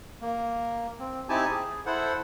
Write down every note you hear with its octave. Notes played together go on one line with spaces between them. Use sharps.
A#3
C4
C4 D#4 E4 G4 G#5 A5
G#4
E4 A4 C5 F#5